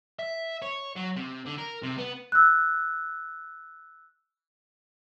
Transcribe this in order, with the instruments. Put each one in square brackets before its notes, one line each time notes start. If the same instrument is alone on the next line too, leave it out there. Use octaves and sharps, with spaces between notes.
[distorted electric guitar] E5
C#5
F#3
C3
D3
A#4
C3
B3
[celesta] E6 F#6